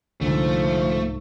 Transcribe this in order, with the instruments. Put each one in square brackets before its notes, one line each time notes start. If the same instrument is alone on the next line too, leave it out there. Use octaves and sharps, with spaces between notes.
[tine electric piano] C2 G#2 [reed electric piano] D3 [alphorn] F3 [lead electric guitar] A3